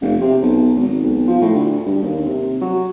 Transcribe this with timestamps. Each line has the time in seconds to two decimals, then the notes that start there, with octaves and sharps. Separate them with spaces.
0.02 F1
0.21 C3
0.42 B1
0.76 G#1
1.03 B1
1.27 F3
1.42 A2
1.54 D2
1.86 G2
2.03 D#2
2.26 C3
2.61 F#3